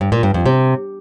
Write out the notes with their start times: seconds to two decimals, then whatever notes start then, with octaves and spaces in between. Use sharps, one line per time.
0.01 G2
0.12 A#2
0.23 G2
0.34 F2
0.46 C3